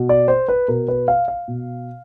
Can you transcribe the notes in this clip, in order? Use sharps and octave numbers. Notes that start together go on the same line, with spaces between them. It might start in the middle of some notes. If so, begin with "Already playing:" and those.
Already playing: B2
D5
C5
B4
B2 A#4
B4
F5
F5
B2